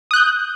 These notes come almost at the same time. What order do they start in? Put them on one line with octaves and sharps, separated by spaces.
D#6 F#6 G6